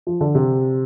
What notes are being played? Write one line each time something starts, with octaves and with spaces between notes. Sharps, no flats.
F3
D3
C3